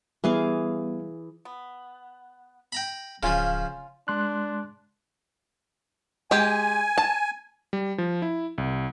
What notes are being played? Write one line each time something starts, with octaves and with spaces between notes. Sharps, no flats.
E3 G3 B3 G#4 F5
B3
G5 A#5 B5
D1 C#3 F3 C#4 F4 G#5
G#3 D4 C6 F#6
G#3 G4 G#5
A5
G3
F3
E4
C2